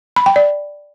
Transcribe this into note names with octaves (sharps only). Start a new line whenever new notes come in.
B5
G5
D5